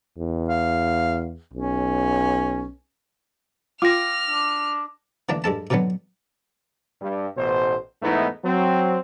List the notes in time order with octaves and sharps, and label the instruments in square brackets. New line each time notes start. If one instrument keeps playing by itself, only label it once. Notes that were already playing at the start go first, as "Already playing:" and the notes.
[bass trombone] E2
[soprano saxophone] F5
[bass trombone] B1 [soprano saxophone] C#4
[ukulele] F4 G5 [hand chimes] D6 A#6 [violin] F6
[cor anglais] D4
[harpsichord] D3 E3 A#3 D4
G2 G#3 A4 A5
B2 D3 D#3 F#3 B3
[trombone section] G2
A1 B2 C5
E2 G#2 A3 B3 D#4 E4
F#3 C4